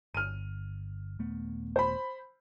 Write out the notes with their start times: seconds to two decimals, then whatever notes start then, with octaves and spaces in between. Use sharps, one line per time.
0.14 G1 F6 D#7
1.19 D#1 A3 B3
1.76 C5 B5